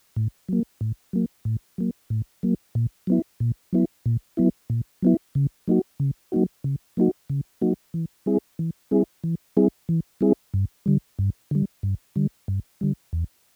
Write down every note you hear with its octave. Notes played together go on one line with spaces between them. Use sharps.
A2
F#3 A#3
A2
F#3 A#3
A2
F#3 A#3
A2
F#3 A#3
A#2
F#3 B3 E4
A#2
F#3 B3 E4
A#2
F#3 B3 E4
A#2
F#3 B3 E4
C#3
F#3 A#3 D#4 F#4
C#3
F#3 A#3 D#4 F#4
C#3
F#3 A#3 D#4 F#4
C#3
F#3 A#3 D#4 F#4
E3
G3 C4 E4 G#4
E3
G3 C4 E4 G#4
E3
G3 C4 E4 G#4
E3
G3 C4 E4 G#4
G2
D3 G3
G2
D3 G3
G2
D3 G3
G2
D3 G3
E2